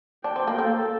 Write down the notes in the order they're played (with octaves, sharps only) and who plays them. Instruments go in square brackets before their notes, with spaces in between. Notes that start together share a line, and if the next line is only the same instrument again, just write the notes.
[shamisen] D4 [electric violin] G5
[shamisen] C4
A#3
[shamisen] A#3 [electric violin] A4